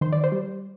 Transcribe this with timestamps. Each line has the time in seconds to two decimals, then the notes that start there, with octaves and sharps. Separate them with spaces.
0.01 D#3 C5
0.12 D5
0.24 C5
0.32 G3